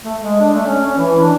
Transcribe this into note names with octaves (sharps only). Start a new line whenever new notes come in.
A3
G#3
D4
A3
C#4
C#4
E3
D4